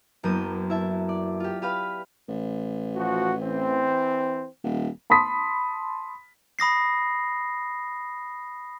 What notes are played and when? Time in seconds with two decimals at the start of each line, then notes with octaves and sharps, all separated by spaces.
0.23 F#1 F#2 A#3 B3 G6 D#7
0.70 E4 E5 A5
1.09 D5
1.40 F4 G4
1.62 G4 B4 F5 B5
2.28 A1
2.96 F3 F#4
3.43 E3 C4
4.64 D#1
5.10 A5 B5 C6 D#6 B6
6.59 B5 D#6 A#6 C7